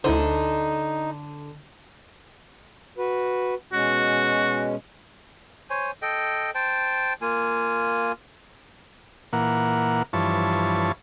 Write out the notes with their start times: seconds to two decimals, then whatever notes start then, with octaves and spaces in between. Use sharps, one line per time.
0.04 D2 D3 D#4 E4 C5
2.98 F#4 B4
3.73 B2 G#3 C#4 F#4
5.70 C5 C#5 G#5
6.02 A4 D#5 G5
6.55 C5 G5 A5
7.22 A#3 F4 G#5
9.33 A#2 E3 A#3 F#5
10.13 G2 E3 F3 C#5 A5